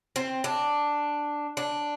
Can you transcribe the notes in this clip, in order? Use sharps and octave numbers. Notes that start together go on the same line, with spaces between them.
C4
D4
D4